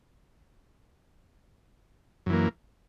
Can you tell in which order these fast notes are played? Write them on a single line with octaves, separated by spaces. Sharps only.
F#2 E3 A#3